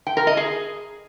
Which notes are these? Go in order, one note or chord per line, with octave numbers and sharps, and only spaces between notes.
G5
A#4
D#5
G#4